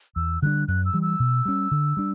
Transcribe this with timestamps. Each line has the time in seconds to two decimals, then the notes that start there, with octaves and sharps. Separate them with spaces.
0.16 E2 E6
0.42 D3 G3 D4 F#6
0.68 F#2 F#6
0.85 E6
0.93 E3 G3
1.02 E6
1.20 B2
1.45 G3 C#4
1.71 D3
1.97 G3 D4